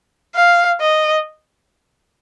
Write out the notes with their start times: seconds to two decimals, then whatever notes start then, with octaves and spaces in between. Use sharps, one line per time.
0.35 F5
0.80 D#5